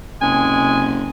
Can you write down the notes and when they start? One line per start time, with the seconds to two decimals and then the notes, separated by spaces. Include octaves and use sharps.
0.21 F#1 C3 G#3 G#5